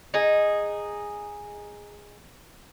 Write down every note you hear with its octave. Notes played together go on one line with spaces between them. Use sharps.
D#4 G#4